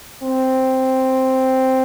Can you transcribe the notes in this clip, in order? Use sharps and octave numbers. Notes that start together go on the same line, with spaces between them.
C4